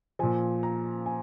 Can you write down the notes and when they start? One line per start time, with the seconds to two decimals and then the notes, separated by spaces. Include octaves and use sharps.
0.19 A#2 F3 G#5
0.63 A#5
1.06 G#5